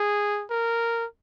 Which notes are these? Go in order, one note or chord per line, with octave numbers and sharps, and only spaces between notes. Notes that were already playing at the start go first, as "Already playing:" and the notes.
Already playing: G#4
A#4